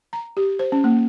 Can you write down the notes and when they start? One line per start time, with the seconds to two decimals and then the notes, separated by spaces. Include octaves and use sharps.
0.13 A#5
0.37 G4
0.59 C5
0.72 C#4
0.84 A#3